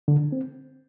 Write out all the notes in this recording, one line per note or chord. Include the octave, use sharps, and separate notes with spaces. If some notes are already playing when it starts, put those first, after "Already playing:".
D3
C4